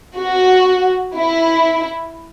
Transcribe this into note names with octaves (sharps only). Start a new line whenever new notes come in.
F#4
E4